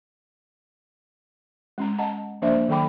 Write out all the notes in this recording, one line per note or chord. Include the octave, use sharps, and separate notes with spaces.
G#3 C#4 A#5
D#5 F#5 A5 A#5
F3 A#3 D4 C5 D5 E5
D#3 F#3 A4 G5 B5 D6